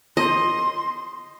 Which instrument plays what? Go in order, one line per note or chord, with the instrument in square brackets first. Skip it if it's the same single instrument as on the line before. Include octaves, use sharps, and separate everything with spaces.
[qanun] D#5 [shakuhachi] C6